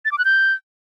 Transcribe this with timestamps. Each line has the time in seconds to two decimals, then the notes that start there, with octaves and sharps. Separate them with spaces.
0.05 A6
0.12 D6
0.18 F#6
0.25 G6